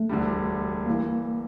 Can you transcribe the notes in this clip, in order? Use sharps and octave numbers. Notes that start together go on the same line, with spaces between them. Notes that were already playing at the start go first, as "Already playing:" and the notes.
Already playing: A3
E1 D2 D3 G3
E3 A#3